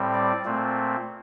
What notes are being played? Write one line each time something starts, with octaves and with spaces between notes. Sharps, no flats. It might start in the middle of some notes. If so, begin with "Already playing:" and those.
Already playing: A2 G3 C4
D5
A#2 A3 C4